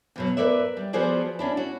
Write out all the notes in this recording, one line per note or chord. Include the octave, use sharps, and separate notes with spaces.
E2 B2 F#3
A#4 B4 C#5 D5 E5
G3
F3 B3 F#4 G#4 C5 D5
C#4 D4 E4
F#4